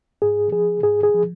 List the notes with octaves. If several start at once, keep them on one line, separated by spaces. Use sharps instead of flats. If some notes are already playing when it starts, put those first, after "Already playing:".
G#2 G#4
F3 G#4
G#2 G#4
G#4
F3